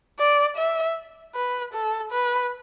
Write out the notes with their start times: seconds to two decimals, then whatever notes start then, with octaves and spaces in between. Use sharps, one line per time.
0.19 D5
0.57 E5
1.35 B4
1.73 A4
2.12 B4